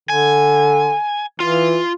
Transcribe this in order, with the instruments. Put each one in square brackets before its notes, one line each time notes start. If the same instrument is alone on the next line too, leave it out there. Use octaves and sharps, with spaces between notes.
[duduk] D3 [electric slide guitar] G#5
[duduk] E3 [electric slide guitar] F4